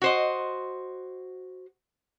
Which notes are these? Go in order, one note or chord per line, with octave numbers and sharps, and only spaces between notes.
F#4 C5 D#5